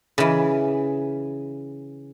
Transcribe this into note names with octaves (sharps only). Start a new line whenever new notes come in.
C#3 E3